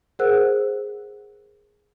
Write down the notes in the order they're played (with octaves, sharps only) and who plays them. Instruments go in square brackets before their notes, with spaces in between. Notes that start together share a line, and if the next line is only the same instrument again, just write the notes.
[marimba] G#4 A#4 C5 F#5 E6 F#6